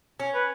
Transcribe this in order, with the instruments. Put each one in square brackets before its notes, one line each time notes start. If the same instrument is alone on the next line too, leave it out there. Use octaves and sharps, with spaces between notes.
[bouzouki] C#4
[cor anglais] B4